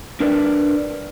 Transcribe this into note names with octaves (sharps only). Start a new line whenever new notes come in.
D4 A#4 B4 D5